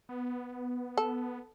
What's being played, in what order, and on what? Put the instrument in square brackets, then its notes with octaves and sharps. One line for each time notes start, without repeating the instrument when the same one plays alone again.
[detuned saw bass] B3
[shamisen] A4